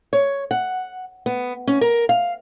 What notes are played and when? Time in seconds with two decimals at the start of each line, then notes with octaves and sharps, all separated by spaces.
0.13 C#5
0.51 F#5
1.26 B3
1.67 C#4
1.81 A#4
2.09 F5